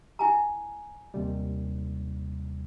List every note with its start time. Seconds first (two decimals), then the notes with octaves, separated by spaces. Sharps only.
0.19 E4 G#5 A#5
1.14 D#2 C3 G3